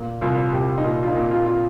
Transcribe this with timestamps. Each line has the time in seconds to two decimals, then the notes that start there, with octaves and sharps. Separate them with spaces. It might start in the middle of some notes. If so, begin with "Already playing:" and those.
Already playing: A#2
0.21 C2 F4
0.52 C2 G4
0.78 D#4
0.84 A#2 F4
1.03 F4
1.08 D#4
1.15 A#2
1.31 F4
1.46 F4